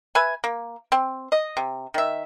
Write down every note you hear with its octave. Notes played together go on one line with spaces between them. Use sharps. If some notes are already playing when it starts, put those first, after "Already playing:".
B4 E5 G#5
A#3
C4
D#5
C3
D#3 E5